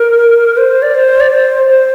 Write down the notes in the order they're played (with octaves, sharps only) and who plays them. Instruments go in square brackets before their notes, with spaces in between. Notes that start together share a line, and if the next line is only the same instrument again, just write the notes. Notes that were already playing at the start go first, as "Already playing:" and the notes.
Already playing: [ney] A#4
C5
D5
C5
D5
C5
C5